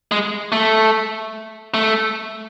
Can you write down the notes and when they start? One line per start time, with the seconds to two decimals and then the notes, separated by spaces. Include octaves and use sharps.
0.12 G#3
0.52 A3
1.74 A3